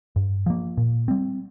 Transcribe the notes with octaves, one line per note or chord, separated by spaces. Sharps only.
G2
F3 A#3
A#2
G3 C4